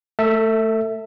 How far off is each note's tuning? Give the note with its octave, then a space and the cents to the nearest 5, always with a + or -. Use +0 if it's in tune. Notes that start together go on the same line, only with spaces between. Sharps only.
A3 +0 A4 +30 E5 -10